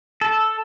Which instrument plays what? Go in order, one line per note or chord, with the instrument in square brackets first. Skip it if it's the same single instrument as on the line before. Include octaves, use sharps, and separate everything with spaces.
[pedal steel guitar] A4